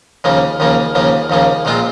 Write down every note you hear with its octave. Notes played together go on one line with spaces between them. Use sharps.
D#2 C#3 F3 A#3
D#2 C#3 F3 A#3
D#2 C#3 F3 A#3
D#2 C#3 F3 A#3
A#1 A#2 G#3 C4 F4